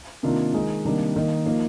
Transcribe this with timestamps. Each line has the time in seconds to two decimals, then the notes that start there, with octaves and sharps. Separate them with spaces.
0.23 C3 D#3 A#3 D4 F4
0.53 D#3 G#3 D#4
0.84 C3 D#3 G3 A#3 D4
1.16 D#3 A#3 D#4
1.46 F3 A#3 D#4